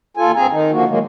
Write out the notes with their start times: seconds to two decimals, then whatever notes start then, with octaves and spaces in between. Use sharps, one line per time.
0.17 D#2 F4 A4 G#5
0.36 G2 C4 G#4 G#5 A#5
0.50 D#3 D#4
0.71 D3 F3 A#3 F#4
0.88 A2 D#3 F#3 G#3 A#3